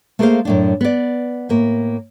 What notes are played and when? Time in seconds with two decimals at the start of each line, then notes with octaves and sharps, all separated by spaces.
0.19 A3 A#3 G#4 A4 C5 F5
0.45 F#2 A2 D4
0.81 B3 D5
1.49 A2 A#3